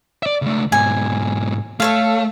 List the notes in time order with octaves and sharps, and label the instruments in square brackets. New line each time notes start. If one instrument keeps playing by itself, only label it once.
[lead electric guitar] D5 E5
C#2 A3
[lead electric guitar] G#2 B2 [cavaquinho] G#5
[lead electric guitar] A3 [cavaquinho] A4 C#5 F5